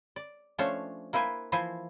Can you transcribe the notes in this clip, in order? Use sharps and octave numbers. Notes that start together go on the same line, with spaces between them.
D5
F3 A3 C#4 D4 C5 C#5
A#3 E4 B4 C5 G#5
E3 F3 E4 C5 G#5